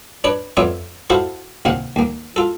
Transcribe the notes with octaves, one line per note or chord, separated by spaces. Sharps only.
D4 B4 C#5 D5
F2 B3 F4 C#5 D5 E5
E4 F#4 A4 C5 E5 F5
D#2 C3 F5 F#5
D#2 A#3
F4 A4